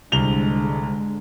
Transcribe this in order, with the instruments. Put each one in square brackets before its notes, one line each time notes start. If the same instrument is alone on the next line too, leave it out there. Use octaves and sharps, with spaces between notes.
[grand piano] C2 F7 G7 [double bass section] G#2 D3 G#3